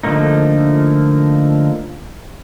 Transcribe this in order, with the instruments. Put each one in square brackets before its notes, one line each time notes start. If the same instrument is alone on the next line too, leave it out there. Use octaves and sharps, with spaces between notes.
[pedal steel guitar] D3 F3 A3 A#3 D#4